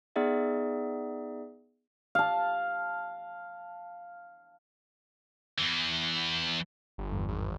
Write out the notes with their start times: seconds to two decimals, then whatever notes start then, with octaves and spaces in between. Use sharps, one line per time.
0.16 B3 D#4 G#4 D5 E5
2.15 F5 A5
5.58 E2 E3
6.98 G1
7.12 E2 G2
7.28 G#1